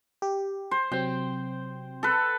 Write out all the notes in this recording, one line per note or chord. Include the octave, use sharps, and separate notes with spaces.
G4
C5
C3 F#3 C4 G5
A4 B4